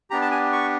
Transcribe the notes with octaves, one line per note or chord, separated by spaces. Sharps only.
B3 D4 G4 A#5
A5
G#5
C#6